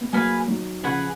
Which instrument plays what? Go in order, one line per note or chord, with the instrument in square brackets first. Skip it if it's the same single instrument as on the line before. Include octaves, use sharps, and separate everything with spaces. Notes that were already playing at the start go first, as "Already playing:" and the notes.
[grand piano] B3
[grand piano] F#3 A#3 [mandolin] G#4 B4 F5 G#5
[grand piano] D#3 F#3
[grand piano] C#3 F3 [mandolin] G#4 B4 F#5